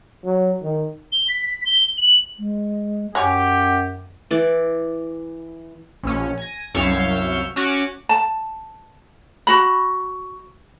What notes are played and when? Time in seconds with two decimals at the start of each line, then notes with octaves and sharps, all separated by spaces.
0.25 F#3
0.63 D#3
1.12 G7
1.28 B6
1.47 B6
1.66 G7
1.97 F#7
2.39 G#3
3.15 F#2 F#3 G4 C#5 F#5 G#5
4.31 E3 D5
6.03 A#1 C#4
6.38 G#5 A#6
6.74 C2 F#2 C#5 E5 F5 G6
7.56 C#4 F#4 D6
8.09 A5
9.47 F#4 B5